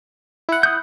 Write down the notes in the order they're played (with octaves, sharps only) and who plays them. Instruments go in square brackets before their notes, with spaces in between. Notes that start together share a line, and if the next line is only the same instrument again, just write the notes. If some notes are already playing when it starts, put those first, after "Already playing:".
[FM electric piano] E4 F#5
[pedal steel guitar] D#6 G6